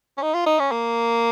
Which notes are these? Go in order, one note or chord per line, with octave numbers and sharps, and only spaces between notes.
C#4
D#4
F4
D#4
C#4
A#3